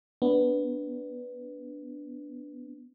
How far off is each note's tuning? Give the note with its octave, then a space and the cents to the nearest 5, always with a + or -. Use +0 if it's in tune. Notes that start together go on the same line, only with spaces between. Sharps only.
B3 +0 D4 -10